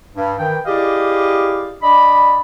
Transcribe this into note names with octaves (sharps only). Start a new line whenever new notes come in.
G2
D#3 E3 G5
E4 G4 G#4 D5 D#5 F5
D4 D5 D#5 B5